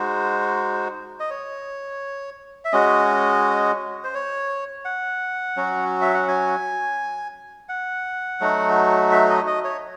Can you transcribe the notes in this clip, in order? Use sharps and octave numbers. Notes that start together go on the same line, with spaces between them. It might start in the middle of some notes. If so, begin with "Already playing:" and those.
Already playing: G#3 D#4 F#4 C5
D#5
C#5
E5
G#3 C#4 F#4 D#5
C5
C#5
F#5
F#3 C#4 F#4
E5
F#5
G#5
F#5
F#3 A3 D#4 F#4
E5
D#5
D#5
C#5